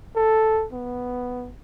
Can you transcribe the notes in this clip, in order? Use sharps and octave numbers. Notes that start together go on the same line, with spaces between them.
A4
B3